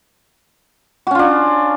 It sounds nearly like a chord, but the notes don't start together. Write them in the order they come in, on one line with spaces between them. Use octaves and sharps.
F#4 C#4 F4 D4